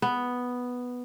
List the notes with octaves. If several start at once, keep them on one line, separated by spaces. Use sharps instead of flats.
B3